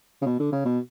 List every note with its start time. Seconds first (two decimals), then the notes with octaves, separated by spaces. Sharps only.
0.22 C#3
0.26 B2
0.40 D3
0.52 C#3
0.65 B2